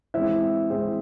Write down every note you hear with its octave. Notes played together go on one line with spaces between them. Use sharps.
E3 G#3 C4 C5 E5
E3 G#3 C4 G#4 C5